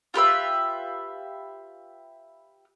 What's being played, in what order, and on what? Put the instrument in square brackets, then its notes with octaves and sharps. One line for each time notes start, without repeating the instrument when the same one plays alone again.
[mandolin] F4 G4 B4 E5